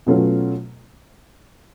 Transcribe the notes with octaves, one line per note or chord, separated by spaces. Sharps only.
B2 F#3 A3 C#4 F4